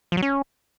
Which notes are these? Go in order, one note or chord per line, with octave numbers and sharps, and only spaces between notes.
F3
F#3
C#4